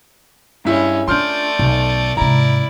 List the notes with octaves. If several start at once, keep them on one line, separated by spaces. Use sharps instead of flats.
G2 G#3 C#4 E4
A3 D4 F4 D5 C6 F6 G6
B1
G#2 C3 E4 D5 A#5